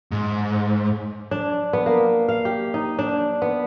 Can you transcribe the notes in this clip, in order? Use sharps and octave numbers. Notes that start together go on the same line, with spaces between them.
G#2
D4
B3
A#3
F5
G4
D#4
D4
B3